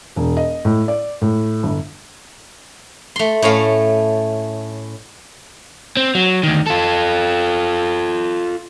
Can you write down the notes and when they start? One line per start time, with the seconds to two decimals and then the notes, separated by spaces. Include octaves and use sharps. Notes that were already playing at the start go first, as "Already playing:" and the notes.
0.16 E1
0.37 D#5
0.65 A2
0.88 D5
1.22 A2
1.63 G1
3.16 A3 C6
3.42 A2 A3 C#4 F5
5.97 C4
6.15 F#3
6.43 D2 D#3
6.67 F4 A4